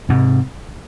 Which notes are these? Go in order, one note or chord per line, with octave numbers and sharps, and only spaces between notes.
G#2 C3